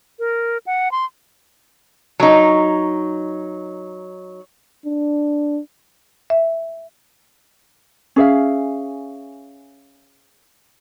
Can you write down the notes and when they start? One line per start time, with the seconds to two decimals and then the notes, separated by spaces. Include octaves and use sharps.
0.19 A#4
0.67 F#5
0.91 C6
2.20 F#3 D#4
4.86 D4
6.30 E5
8.16 C#4 G#4 E5 F5